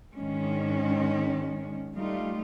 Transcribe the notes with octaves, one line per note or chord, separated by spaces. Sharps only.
G#2 D#3 G#3 C#4 D4
G3 A3 D#4 F4